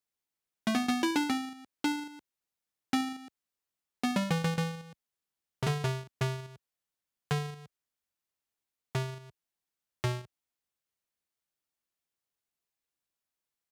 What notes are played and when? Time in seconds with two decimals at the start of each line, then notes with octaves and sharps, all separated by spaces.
0.67 A3
0.75 B3
0.89 B3
1.03 E4
1.16 D4
1.30 C4
1.84 D4
2.93 C4
4.03 B3
4.16 G3
4.31 E3
4.45 E3
4.57 E3
5.63 C3
5.67 D3
5.85 C3
6.22 C3
7.31 D3
8.95 C3
10.04 B2